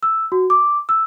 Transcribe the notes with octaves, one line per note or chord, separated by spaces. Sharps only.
E6
F#4
D6
E6